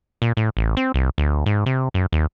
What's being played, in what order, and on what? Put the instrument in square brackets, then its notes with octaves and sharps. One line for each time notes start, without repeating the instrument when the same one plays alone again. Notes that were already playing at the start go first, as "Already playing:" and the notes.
[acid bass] A#2
A2
A1
C4
C2
D2
G#2
C3
F#2
D#2